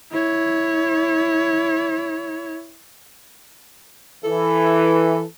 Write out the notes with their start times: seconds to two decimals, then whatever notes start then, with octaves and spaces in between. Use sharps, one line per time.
0.12 E4 C#5
4.24 E3 A4